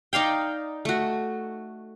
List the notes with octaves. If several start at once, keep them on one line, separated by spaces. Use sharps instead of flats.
D#4 D5 F5 G5
A3 F#4